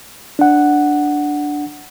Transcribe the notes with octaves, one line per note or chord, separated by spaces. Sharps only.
D4 F#5